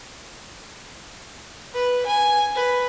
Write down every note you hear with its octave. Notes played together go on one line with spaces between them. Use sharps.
B4
G#5
B4